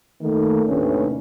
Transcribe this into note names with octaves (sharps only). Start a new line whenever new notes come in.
D#3 A3 A#3
D#2 A2 C3 C#4 D4 B4